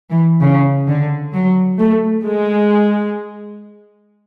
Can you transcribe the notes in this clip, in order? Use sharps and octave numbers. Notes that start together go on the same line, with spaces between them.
E3
C#3
D3
F#3
A3
G#3